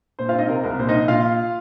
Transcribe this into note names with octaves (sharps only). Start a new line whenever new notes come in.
A#2 C5
F4 F5
C4 D#4 D#5
C3 A#4
C2 A#4
A#2 C5
D#4 D#5
A#1
A#2 F4 F5